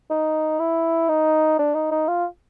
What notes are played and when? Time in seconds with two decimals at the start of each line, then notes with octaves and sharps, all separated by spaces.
0.10 D#4
0.59 E4
1.09 D#4
1.59 D4
1.75 D#4
1.91 D#4
2.08 F4